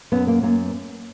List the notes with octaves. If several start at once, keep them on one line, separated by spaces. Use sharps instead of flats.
F#2 B3
A#3
F#2 A#3